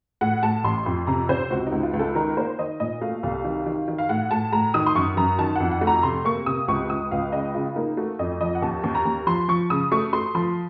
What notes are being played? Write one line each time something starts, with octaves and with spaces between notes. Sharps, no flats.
A2 F#5
A2 A5
A1 C6
F2 C6
C3 A#5
C3 C5
C#2 F#4
D#4
C#2
F4
C#2
A4
D#3 A#4
A#3 C5
D#3 D#5
A#2 D#5
A3 F5
C2 F5
D#3
D#3
D#3
F5
A2 F#5
A2 A5
A2 A#5
D#3 D#6
C6
F#2 C#6
F#2 A#5
D#3 A5
F2 F#5
F#5
A3
A#5
C3 C6
A#3 C#6
C3 D#6
C#2 C#6
C#2 D#6
C#2 F5
C#3 D#5
C#3 F4
A#3 D#4
A3 F#4
F2 D#5
F3 D#5
F#5
D#2 A5
D#2
A#5
D#2
F3 C6
F3 C#6
C#3 D#6
A3 C#6
A3 C6
F3 C6